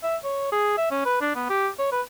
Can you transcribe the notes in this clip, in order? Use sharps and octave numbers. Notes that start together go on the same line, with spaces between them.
E5
C#5
G#4
E5
C#4
B4
D4
B3
G4
C#5
B4